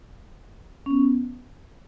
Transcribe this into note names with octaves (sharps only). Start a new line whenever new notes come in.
C#4
B3